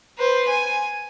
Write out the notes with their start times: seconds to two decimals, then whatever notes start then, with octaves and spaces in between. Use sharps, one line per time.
0.18 B4 C5
0.48 G#5